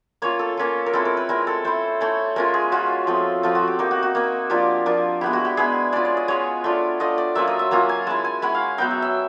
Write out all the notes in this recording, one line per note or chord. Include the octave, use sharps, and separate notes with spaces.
A#3 C#4 F4 C#5
A4
A#3 C#4 F4
A#4
G#3 C4 E4 A4
A#4
B4
G#3 C4 E4 A#4
A4
A3 C#4 E4 C5
A3 C#4 E4
G#3 C#4 F4 A#4
G#4
G#3 C#4 F4 F#4
F3 A3 C4
F3 A3 C4 F4
F#4
G4
A#3 D#4 G4
F#4
F#4
A#3 D#4
F3 A#3 D4 F4 G4
F3 A#3 D4 F4
G#3 B3 E4 G4
F#4
G4
G#3 B3 E4 G#4
G#3 C#4 F4 D5
D5
D#5
G#3 C#4 F4 C#5
A3 D4 F4
A3 D4 F4 D#5
D5
F#3 A#3 C#4 F4 E5
D#5
E5
F#3 A#3 C#4 F4 A#5
G#5
G#3 C#4 E4 A5
G#5
G#3 C#4 E4 F#5
F5
F#3 B3 D#4 G5
E5
E5